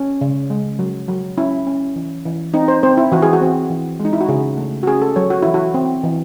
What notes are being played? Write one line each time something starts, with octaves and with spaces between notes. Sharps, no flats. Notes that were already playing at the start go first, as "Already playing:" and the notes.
Already playing: C#4
C#3
G#3
F#3
F#3
C#4 E4
C#4
E3
E3
C4 D#4
C5
C4 C5
E4
E3 F#4
G#4
F#4
C4
E3
G#3
D#4
E4
F#4
C#3 G#4
A3
F#4
C#4 G#4
A4
F#3 C#5
F#4
E3 E4
F#4
C4
E3